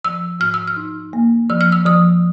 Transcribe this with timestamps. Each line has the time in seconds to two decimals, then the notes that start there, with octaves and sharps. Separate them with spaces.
0.05 F3 E6
0.40 G#2 F6
0.54 E6
0.68 F6
0.76 D#4
1.13 A#3
1.50 F3 E6
1.61 F6
1.72 E6
1.85 F3 D#6